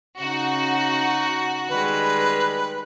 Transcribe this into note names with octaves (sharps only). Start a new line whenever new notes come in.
C#3 D#4 F#4
D#3 G3 G#3 B4